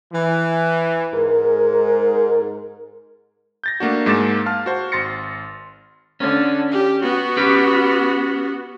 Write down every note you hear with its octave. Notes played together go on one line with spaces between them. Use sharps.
E3
G#2 A#4
G6 A6 A#6
A3 A#3 D4 F#4
G#2 G#3 A#3 D6 A6 E7
F5 A5 F6
F#4 C5
G#1 C6 A6 A#6 C#7
D3 C#4
G4
B3 F#4
C#4 G4 B4